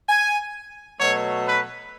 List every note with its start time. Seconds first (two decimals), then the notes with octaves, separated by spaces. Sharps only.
0.09 G#5
1.00 B2 F#3 A3 C#5
1.46 B4